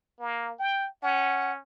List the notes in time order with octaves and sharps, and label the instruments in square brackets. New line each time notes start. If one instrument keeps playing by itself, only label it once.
[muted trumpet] A#3
G5
[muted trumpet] C#4 [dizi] F#5